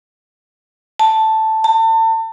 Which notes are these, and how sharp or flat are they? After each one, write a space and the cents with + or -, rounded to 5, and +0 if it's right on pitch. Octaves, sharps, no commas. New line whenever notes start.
A5 +0
A5 +35